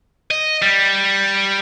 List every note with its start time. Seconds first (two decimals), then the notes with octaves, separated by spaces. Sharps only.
0.31 D#5
0.62 G3